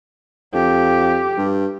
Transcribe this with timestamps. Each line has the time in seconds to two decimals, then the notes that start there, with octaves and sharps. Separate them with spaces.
0.54 F2 G4
1.37 G2